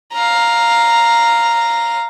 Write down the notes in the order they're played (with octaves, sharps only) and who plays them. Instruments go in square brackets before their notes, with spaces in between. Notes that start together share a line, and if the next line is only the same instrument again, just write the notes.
[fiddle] F5 A#5